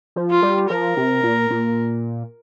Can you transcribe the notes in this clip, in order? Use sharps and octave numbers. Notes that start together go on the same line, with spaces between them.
F3
F4
G3
F3 A#4
C3
A#2
A#2